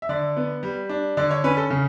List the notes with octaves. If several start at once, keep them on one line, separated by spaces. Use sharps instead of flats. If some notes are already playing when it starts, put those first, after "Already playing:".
E5
D3 D5
B3
G3
D4
D3 D5
C#5
C#4 B4
A4
C#3